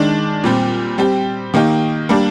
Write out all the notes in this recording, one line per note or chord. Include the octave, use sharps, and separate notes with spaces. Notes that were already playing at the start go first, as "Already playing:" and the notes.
Already playing: D#3 G#3 D4
A#2 G3 C4 G4
G3 C4 G4
D#3 A#3 D#4 G4
G3 A#3 D4